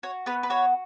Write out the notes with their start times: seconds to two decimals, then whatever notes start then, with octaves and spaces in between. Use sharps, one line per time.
0.03 F#4 C#5
0.26 B3 B4
0.43 B4
0.50 F#4 C#5